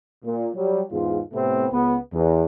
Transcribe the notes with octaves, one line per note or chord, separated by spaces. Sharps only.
A#2
F#3 G3
E2 G#2 F4
A2 C3 A3 B3 C4
C#2 B3
E2